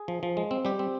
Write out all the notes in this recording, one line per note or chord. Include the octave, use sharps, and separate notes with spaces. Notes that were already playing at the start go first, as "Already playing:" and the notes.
Already playing: G#4
F3
F3
G#3
C4
G3 G4
C4